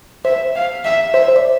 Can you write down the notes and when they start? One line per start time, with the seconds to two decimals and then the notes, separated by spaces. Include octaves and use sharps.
0.25 C5 E5
0.55 F5
0.84 E5
1.14 C5 E5
1.28 C5
1.36 D5